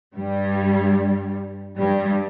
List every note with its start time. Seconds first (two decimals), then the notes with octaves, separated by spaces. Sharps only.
0.14 G2 G3
1.79 G2 G3